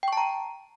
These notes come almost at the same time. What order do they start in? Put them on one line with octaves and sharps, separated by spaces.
G5 C#6 A5 A#5